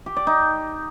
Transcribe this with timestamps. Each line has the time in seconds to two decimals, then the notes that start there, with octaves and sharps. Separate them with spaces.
0.06 G4
0.17 D5
0.27 D#4